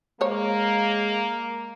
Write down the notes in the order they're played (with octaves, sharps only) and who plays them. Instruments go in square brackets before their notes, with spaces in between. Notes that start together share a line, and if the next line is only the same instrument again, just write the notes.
[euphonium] G#3 [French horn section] A#3 [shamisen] C5 C#5